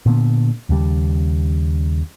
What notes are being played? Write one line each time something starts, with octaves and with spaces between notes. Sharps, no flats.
A#2 D3 B3
D#2 C#3 G3